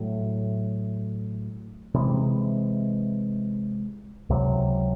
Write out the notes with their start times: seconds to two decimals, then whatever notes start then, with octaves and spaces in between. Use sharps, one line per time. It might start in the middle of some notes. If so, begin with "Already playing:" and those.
Already playing: A2 F#3 A3
1.94 C3 E3 G#3
4.29 C#2 C3 F#3